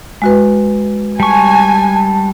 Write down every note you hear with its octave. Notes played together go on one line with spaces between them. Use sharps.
G#3 F#4 B4
G3 G#5 A5 C#6